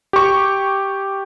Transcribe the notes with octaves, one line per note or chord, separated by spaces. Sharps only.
G4 C#6